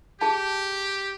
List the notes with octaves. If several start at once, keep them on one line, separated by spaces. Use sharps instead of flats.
G4 G#4 A5